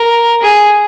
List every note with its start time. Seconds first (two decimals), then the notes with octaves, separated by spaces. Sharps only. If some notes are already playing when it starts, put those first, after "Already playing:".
Already playing: A#4
0.42 G#4